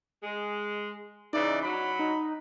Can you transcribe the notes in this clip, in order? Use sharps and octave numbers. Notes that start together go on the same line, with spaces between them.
G#3
C#3 E3 D#4 D5
F#3 B5
D#4